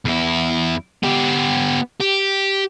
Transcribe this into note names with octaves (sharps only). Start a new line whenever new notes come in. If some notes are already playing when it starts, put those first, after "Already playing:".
E2 E4
B3 G4
G4